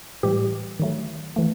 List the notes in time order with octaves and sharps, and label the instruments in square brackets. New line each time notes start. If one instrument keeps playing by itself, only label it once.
[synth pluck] A2 E3 G3 G4
D#3 F#3 A3
E3 A3